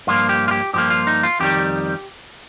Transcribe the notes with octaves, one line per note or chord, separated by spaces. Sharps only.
G2 F3 A#3 F4
G4
F4
G4
G2 F3 A#3 G4
F4
D#4
F4
F2 D#3 G3 G4